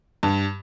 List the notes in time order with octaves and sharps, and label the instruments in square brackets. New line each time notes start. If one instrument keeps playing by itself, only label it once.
[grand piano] G2